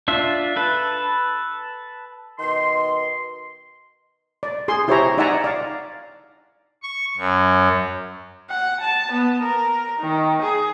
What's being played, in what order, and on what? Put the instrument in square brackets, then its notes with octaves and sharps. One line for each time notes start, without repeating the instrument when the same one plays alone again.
[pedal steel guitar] D4 F4 E5
A4 B4
[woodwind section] B2 D#3 C6
[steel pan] D5
G#4 C6
E4 G4 C5 C#5 E5 A#5
D#4 D5 E5 F#5 G#5 A#5
D5 F5
[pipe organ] C#6
F#2
[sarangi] F#5
A5
B3
A#4
D#3
G#4